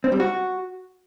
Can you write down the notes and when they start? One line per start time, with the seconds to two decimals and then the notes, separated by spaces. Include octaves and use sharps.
0.04 C4
0.12 G3
0.20 F#4